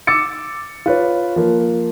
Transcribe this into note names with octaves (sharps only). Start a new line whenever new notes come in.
D6 E6 A6 C#7
F4 B4 C#5
F3 A#3